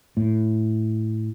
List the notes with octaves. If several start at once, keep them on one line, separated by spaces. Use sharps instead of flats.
A2